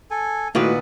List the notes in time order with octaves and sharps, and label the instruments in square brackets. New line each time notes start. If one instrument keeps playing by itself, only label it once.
[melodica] A4 G#5
[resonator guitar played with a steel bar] A#2 D#3 B4 [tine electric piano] A3 E4 F#4 [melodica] B3